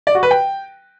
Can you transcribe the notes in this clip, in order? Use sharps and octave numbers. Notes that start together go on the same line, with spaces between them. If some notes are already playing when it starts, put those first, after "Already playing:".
D5
F#4
B4
G5